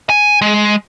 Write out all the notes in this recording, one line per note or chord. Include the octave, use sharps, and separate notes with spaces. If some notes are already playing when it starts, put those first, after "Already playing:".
G#5
G#3